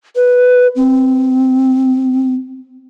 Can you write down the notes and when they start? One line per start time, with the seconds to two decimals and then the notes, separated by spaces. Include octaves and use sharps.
0.16 B4
0.76 C4